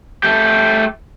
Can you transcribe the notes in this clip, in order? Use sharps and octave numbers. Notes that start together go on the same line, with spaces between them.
A3 G4